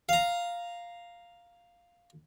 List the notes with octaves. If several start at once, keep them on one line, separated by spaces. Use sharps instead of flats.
F5 A#5